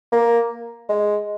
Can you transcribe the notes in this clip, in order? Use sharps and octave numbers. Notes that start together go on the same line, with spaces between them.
A#3
G#3